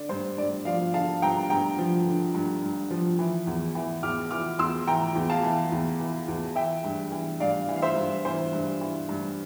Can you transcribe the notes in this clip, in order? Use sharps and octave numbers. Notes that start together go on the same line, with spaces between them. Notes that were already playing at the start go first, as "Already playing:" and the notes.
Already playing: D3 D5
G2 C5
G2 D5
F3 D5 F5
D3 F5 A5
G2 G5 A#5
G2 G5 A#5
F3
D3
G2
G2
F3
E3
E2
E3
E2 D6 F6
E3 D6 F6
E2 C6 E6
E3 G5 A#5
E2
F5 A5
E3
E2
E3
E2
E3 E5 G5
G2
E3
G2 D5 F5
E3
F5
C5 E5
G2
E3 C5
G2
E3
G2